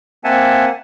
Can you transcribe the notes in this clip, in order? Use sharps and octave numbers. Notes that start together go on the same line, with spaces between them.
A#3 C4 E5 F#5 G#5 A5